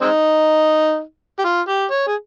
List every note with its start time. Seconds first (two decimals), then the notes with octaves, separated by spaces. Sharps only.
0.01 G#3 C4 D#4
1.39 G4
1.44 F4
1.68 G4
1.91 C#5
2.07 G#4